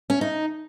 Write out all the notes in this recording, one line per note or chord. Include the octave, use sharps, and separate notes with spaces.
C#4
D#4